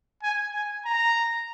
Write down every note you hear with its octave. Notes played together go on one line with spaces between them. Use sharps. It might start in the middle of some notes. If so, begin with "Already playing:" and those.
G#5
G#5
A#5